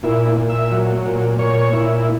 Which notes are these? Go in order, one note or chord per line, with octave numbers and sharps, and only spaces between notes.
A#2 E4
A#2
E5
F#3
A#2
A#2 C#5
A#2 E4